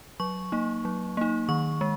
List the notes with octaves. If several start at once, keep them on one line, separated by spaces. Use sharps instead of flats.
F#3 C#6
A#3 D#4
F#3
A#3 D#4
D#3 C#6
G#3